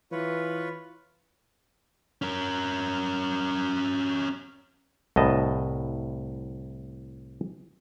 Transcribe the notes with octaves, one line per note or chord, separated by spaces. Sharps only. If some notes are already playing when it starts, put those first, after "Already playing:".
E3 F4 B4 C#5
C#4 A#4
C2 A2 D#5 A5